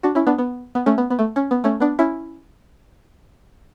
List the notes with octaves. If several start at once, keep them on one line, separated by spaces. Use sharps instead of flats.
D4 F#4
C#4 E4
B3 D4
B3
B3
A3 C#4
B3
B3
A3
C#4
B3
A3 C#4
B3 D4
C#4 E4